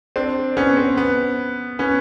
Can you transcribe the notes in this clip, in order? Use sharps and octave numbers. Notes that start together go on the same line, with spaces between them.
C4 D4
B3 C#4
C4
B3
B3 C#4